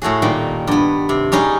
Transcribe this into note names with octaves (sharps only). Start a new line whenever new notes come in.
A2 A3 F#4 G#4
A#2 D#3 G3 A#3
G2 B3
C3
G3 C#4 D#4 G#4